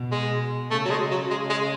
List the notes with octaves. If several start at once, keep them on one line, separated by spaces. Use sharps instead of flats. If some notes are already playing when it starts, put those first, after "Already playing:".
Already playing: B2
G#3
C#3 A3
F#3
G#3
C#3
F#3
G#3
G#3